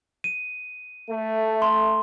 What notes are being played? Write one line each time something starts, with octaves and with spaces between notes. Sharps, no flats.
D#7
A3
C6